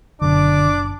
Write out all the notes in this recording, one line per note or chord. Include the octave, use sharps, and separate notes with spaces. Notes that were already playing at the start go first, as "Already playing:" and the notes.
F#1 F#2 B2 D3 D4 D6